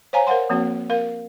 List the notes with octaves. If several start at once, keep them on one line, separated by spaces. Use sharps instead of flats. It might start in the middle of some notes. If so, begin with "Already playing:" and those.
C5 C#5 F5 G#5 A#5
A#4 C5 F5 F#5 C6
F3 A#3 C4 F#4
A#4 F5